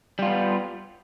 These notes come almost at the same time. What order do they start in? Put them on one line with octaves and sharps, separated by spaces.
G3 F4 B3